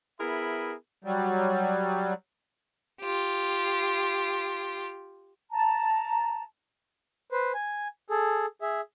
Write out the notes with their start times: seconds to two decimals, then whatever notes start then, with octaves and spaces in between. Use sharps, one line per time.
0.19 B3 E4 G#4 A#4 E5 B5
1.04 F#3 G3
3.01 F4 G4
5.51 A5 A#5
7.32 B4 C5
7.54 G#5
8.10 G#4 A4
8.62 G#4 E5